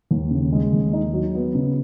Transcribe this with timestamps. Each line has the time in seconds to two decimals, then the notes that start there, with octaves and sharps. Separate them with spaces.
0.11 D#2
0.31 C#3
0.52 G#3
0.73 D#2
0.93 D#4
1.14 F#3
1.35 B3
1.55 C#3